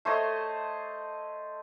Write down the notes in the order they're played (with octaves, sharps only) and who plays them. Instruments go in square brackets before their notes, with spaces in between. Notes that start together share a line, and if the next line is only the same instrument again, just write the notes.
[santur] A3 C5 C#5 D#5